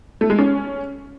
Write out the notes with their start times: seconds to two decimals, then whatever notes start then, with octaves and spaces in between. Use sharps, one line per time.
0.21 A3
0.30 G#3
0.39 C#4